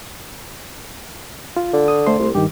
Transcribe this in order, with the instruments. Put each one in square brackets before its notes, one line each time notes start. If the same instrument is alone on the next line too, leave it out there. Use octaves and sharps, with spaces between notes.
[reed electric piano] F4
[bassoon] D3
[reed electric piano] D#6
A3 C5 C6
[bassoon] C2
[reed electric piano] G2 D#3 [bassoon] G4